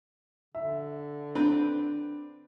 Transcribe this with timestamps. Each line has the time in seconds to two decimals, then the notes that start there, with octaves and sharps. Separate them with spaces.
0.55 D3 E5
1.35 C4 D4 B4